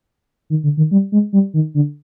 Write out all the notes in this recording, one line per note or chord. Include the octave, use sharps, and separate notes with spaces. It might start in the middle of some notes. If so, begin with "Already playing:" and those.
D#3
D3
D#3
G3
G#3
G3
D#3
D3